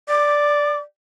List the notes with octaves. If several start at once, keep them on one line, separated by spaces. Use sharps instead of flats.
D5 D6